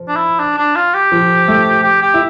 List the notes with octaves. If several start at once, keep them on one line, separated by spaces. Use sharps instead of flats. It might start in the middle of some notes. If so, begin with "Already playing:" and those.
Already playing: F3
D4
E4
D4
D4
F4
G4
F3
A3
G4
G4
E4